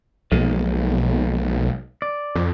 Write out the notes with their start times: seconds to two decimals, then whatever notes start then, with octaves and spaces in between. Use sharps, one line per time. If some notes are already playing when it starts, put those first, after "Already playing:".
0.32 B1 F3 G#3 A#3
2.02 D5
2.35 F2